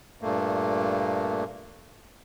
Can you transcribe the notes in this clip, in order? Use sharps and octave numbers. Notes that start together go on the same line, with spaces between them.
G2 A#2 A3 A#3